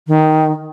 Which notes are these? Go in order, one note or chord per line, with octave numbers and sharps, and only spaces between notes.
D#3